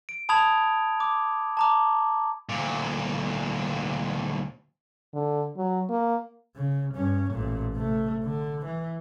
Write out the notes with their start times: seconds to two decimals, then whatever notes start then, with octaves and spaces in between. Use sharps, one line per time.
0.09 D7
0.29 A5 B5 D#6 G#6 F7
1.00 D6
1.57 A5 A#5 D6
2.49 D2 A#2
5.14 D3
5.57 F#3
5.89 A#3
6.56 C#3
6.94 G2 C#4
7.30 A1 A#2
7.73 C3 A3
8.24 D3
8.65 E3